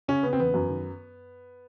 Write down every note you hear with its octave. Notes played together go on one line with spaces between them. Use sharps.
C#3 C#4
C#3 B3
C4
E2 B3
F#2
D#3